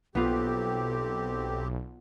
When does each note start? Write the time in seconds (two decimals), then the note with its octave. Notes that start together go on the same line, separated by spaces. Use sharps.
0.15 B1 B3 C4 F4 G4 A4